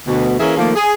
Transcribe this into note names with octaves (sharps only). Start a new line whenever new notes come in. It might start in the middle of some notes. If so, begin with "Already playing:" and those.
D2 B2
E3 A#3 C#4 E4 G#4 A#4
D#3 F3 A3 A#3
G#4